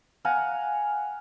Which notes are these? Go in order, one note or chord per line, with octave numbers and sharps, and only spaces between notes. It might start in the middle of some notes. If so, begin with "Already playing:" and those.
F5 F#5 G#5 A#5